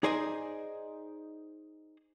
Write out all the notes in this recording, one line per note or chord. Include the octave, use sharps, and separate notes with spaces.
D#4 G#4 C5 D5 D#5 G#5